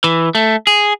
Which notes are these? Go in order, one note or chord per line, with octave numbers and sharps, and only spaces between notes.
E3
A3
G#4